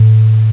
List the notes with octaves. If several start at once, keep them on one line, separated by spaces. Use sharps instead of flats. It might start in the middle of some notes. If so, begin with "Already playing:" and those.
Already playing: A2